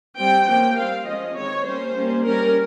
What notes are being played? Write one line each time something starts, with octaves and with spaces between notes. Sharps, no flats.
G3 C4 G5
F3 A#3 C#4 G5
G3 C4 F5
F3 G#3 C#4 D#5
D#3 G#3 C4 C#5
G3 A#3 C#4 C5
G3 A#3 C#4
G3 C#4 A#4